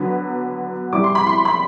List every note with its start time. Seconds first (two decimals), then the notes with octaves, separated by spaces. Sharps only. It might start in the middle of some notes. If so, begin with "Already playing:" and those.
Already playing: D3 F#3 B3
0.93 C3 E3 G3 D6
1.04 C6
1.15 B5
1.27 C6
1.45 B5